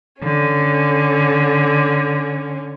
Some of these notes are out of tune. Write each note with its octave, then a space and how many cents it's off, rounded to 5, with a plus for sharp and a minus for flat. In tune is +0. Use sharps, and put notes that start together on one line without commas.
D3 +0 C#4 +0